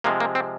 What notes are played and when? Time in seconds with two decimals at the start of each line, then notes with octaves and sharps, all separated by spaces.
0.04 C3 F3 G#3 A#3
0.20 A#3
0.35 C4